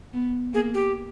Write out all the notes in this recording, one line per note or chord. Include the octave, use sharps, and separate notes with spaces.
B3
A#3 G#4
G4